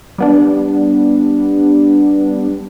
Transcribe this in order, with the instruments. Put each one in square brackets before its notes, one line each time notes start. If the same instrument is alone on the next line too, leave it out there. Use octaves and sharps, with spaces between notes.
[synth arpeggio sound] G3 B3 D4